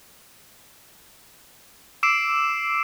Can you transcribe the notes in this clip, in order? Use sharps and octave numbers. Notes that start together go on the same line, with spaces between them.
D6 E6 C7 D7 E7